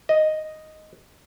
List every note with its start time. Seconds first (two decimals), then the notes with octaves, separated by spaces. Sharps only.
0.09 D#5